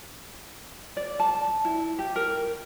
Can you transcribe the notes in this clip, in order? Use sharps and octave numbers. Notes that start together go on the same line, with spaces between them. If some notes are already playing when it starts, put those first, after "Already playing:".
D5
A5
E4
G4
A#4